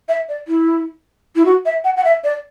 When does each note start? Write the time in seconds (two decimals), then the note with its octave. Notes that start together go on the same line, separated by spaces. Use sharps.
0.08 E5
0.29 D5
0.48 E4
1.35 E4
1.45 F#4
1.65 E5
1.84 F#5
1.97 F#5
2.04 E5
2.24 D5